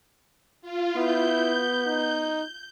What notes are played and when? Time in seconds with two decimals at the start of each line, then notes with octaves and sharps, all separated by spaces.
0.62 F4
0.96 B3 E4 G6
1.87 D#4